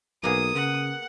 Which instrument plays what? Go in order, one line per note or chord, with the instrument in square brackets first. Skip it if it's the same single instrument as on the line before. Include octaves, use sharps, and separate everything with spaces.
[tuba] B1 [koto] A#3 B3 G#4 [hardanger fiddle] D#6
[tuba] C#3 [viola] F#5